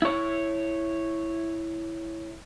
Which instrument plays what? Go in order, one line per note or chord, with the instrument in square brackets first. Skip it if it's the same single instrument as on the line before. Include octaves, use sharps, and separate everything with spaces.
[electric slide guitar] E4 C#5